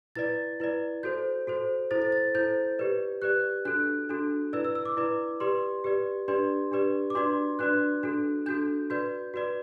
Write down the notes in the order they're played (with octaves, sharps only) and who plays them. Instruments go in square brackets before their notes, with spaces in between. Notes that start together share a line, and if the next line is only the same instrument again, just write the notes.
[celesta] E4 B4 D5 A6
E4 B4 D5
F#4 A4 C5 G6
F#4 A4 C5
E4 A4 C5 A6
A6
A6
E4 A4 C5 G6
G4 B4 D5
G4 B4 D5 F#6
D4 F#4 A4 F#6
D4 F#4 A4
E4 B4 D5 E6
E6
E6
D6
E4 B4 D5
G4 B4 D5 C6
G4 B4 D5
D4 G4 B4 D5 C6
D4 G4 B4 D5
D6
D4 F#4 B4 D5 C6
D4 F#4 B4 D5 F#6
D4 F#4 A4
D4 F#4 A4 G6
F#4 B4 D5 G6
F#4 B4 D5